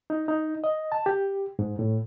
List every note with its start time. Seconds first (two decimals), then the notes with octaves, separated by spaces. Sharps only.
0.10 D#4
0.28 D#4
0.64 D#5
0.92 A5
1.06 G4
1.59 G#2
1.79 A2